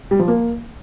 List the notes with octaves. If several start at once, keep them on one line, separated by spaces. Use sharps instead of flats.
G3
F3
A#3